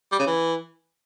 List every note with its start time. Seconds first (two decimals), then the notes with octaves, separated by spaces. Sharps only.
0.12 G3
0.19 C#3
0.27 E3